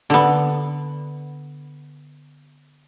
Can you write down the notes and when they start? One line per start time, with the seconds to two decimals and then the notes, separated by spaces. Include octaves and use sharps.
0.10 D3 B3